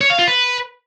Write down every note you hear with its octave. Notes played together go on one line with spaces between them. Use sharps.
C#5
F5
F4
B4